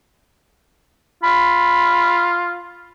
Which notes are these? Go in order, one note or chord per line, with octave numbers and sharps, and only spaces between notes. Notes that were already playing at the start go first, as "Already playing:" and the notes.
F4 B5